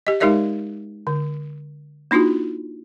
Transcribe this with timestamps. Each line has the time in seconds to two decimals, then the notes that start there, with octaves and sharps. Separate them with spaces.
0.07 G4 D#5
0.20 G#3 D#4 G4 A#4 D5 E5
1.07 D3
2.11 A#3 D4 D#4 F4 F#4